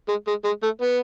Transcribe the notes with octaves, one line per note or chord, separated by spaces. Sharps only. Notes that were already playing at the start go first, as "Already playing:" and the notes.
G#3
G#3
G#3
A3
B3